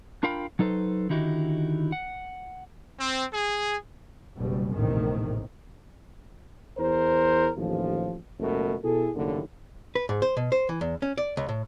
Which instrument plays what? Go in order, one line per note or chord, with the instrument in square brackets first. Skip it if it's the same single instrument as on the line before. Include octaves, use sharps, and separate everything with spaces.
[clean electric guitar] D4 F4 A#4 F5 G5 B5
F#3 D#4 A4 B4 C5
D3 D#3 D#4 E4 F#4 G4
F#5
[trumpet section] C4
G#4
[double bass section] F#1 B2 G3
A#1 E2 A2 C3 D#3
[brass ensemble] E2 E4 A#4 C5
A1 D#2 F3
F#1 C#2 B2 A3 A#4
B2 E4 G#4 A4
F#1 D#2 A2 D3 A#3
[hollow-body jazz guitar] B4
G#2
C5
B2
C5
E3
E2
C#4
D5
C#2
A2